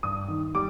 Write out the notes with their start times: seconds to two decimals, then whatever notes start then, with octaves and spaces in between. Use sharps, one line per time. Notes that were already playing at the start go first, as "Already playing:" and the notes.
0.03 G2 D#6
0.28 D#3
0.55 G3 D6